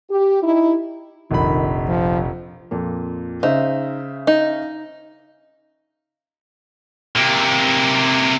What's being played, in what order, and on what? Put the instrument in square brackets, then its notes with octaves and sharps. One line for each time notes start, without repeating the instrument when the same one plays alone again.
[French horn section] G4
D#4 E4
[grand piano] F1 A#1 B5 [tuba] D#3
[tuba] F3
[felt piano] F2 A#2
[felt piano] C#3 C5 E5 [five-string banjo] D#4
[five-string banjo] D#4
[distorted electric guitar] C3 A#3